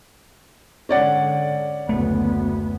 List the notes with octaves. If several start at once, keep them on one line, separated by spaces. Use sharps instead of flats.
G#2 D3 C#4 D5 F#5
F#1 D2 A3 B3